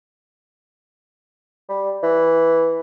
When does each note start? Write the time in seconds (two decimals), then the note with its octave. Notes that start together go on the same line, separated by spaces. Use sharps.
1.69 G3
2.03 E3